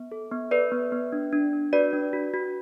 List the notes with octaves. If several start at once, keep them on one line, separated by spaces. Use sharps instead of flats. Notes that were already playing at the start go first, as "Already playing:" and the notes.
Already playing: B3
A4
B3
A4 B4 D5
B3
B3
D4
D4
D4
F#4 B4 D5
D4
F#4
F#4